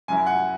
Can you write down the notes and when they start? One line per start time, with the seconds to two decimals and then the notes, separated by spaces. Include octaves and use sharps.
0.08 F#2 F#3 E4 G#5
0.26 F#5